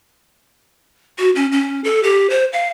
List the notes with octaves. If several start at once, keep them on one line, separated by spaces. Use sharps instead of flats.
F#4
C#4
C#4
A4
G4
C5
F5